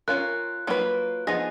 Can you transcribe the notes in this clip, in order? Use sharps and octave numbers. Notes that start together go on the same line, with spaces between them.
C#4 F4 A#4 F#6
F#3 A#3 F4 G#4 B4
F3 B3 D#4 G#4 A#6